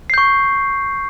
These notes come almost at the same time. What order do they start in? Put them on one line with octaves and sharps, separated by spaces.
C7 G6 C#6